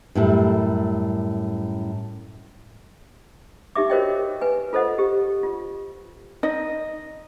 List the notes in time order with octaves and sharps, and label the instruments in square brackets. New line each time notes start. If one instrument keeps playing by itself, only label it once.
[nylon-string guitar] F#2 A2 G3
[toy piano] D#4 G4 E5 D6
F#4 A#4 C5 C#5 D#5 G5
B4 G#5
F4 A4 C5 D#5 F#5
G4
F4
[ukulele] D#4 D#5